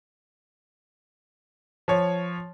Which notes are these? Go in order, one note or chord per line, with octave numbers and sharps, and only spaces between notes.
F3 C#5